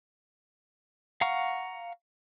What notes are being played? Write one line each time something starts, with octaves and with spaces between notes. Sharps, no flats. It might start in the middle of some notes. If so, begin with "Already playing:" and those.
F5 F#5 A#5 C#6 F6